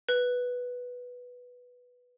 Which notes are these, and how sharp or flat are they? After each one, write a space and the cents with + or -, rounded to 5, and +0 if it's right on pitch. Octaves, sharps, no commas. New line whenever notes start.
B4 -5